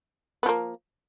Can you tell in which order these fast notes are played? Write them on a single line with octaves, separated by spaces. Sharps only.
B3 F3 A#3